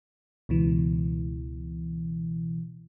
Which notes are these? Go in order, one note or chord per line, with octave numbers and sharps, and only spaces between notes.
C#2 B2 E3